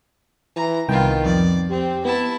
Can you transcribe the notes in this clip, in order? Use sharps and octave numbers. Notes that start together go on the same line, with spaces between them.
E3 A#5
C2 D#3 B3 F4 G5
F2 D5
C4 G4
B3 E4 A5